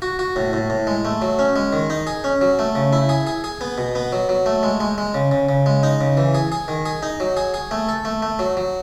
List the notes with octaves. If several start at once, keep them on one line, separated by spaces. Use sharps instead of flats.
F#4
F#4
A2
A2
A2
G#3
A3
F#3
C#4
G#3
D#3
D#4
G#4
C#4
F#3
A3
C#3
E4
G#4
G#4
G#4
B3
B2
B3
F#3
F#3
A3
G#3
G#3
G#3
C#3
C#3
C#3
G#3
D#4
C#3
E3
G#4
G#4
D#3
G#4
D#4
F#3
G#4
G#4
A3
A4
A3
A3
F#3
F#3